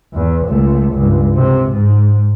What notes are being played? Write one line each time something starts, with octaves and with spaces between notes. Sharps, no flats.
E2
C#2 A3
C#2 G2
C3
G#2